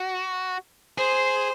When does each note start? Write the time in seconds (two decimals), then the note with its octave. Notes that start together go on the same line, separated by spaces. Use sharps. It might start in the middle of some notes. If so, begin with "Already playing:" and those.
Already playing: F#4
0.98 G#4 C5